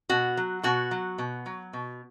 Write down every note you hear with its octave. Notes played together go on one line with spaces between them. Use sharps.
B2 F#4
F#3
B2 F#4
F#3
B2
F#3
B2